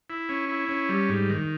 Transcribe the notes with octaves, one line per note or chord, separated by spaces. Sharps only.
E4
C#4
E4
C#4
G3
G#2
D#3